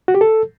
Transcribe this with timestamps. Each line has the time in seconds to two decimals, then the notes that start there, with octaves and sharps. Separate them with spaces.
0.08 F#4
0.15 G4
0.21 A4